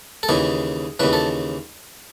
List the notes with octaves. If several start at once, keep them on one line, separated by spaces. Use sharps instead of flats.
A4
D#2 C#3 E3 G#4
D#2 C#3 E3 B4
A4